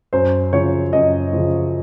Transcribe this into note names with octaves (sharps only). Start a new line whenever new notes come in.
F#2 C5
C#3 F3 C#5
F#2 D#5
C#3 F3